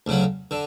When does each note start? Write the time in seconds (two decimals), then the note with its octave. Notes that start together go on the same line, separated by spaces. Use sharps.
0.07 D2 C#3 F#3
0.51 D3